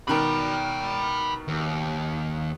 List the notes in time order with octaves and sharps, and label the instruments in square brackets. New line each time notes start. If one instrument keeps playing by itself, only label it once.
[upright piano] B2 D#3 A#4 [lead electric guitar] G5 B5
[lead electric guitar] D#2